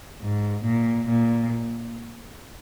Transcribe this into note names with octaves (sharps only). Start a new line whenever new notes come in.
G#2
A#2
A#2